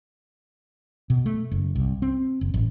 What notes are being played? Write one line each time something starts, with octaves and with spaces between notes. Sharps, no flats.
B2
A3
F#1
C2
C4
F#1
A1